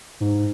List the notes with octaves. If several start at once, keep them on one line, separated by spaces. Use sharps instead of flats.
G#2